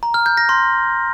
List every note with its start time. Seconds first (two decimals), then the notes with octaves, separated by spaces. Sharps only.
0.03 A#5
0.14 F6
0.26 G6
0.37 A#6
0.49 C6